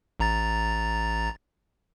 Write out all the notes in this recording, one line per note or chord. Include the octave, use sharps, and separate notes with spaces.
A1 A#5 A6